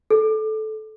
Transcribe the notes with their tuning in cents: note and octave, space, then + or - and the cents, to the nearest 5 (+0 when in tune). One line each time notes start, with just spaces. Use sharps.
A4 -15